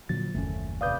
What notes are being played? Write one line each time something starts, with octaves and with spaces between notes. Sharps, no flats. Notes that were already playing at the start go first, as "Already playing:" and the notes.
A#2 D3 F3 F#3 A6
F#1 D#2 A3 C#4
C3 B4 D5 F5 D#6 G6